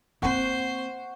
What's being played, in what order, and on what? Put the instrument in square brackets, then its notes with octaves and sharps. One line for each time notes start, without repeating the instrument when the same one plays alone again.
[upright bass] A#3 C4 [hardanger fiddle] C5 [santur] F#5 G5 C#6